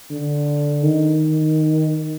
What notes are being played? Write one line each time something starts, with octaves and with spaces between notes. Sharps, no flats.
D3
D#3